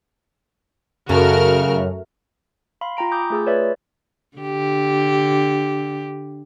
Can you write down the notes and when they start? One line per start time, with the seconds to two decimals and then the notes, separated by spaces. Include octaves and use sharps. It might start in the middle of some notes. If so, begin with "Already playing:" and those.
1.09 F#2 C#3 A3 F#4 A#4 F6
2.81 F5 B5 C6
2.97 F4 G5 A#5 D7
3.11 G#5 B5 D6 D#6 G6
3.30 A3 F4 G#4 B5 E6
3.47 B4 C#5 D5 E5
4.37 D3 G4